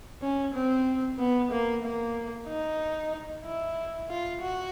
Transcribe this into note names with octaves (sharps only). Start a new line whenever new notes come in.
C#4
C4
B3
A#3
A#3
D#4
E4
F4
F#4